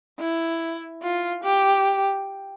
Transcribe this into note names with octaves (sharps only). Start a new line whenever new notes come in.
E4
F4
G4